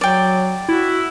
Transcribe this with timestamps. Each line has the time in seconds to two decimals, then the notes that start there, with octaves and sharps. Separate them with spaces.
0.01 F#3 D5 G5
0.69 E4 F#4